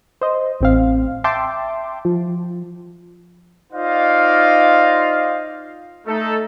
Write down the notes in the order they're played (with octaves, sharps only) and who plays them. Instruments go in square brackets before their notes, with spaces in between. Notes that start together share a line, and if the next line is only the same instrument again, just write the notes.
[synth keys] C5 D#5
A1 C4 F5
E5 G5 A5 C6 D6
F3
[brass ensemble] D#4 F4 C5 D5 D#5 F5
A3 D#4 A4